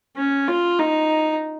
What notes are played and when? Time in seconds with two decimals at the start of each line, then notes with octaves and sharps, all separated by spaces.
0.17 C#4
0.48 F4
0.79 D#4